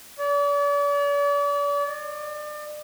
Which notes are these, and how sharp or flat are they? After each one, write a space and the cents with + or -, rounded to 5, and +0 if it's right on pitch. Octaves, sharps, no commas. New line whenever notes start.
D5 -40
D5 +35